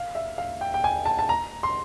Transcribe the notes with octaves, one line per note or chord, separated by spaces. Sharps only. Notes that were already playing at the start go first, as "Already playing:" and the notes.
Already playing: F5
E5
F5
G5
G5
G#5
A5
A5
A#5
C6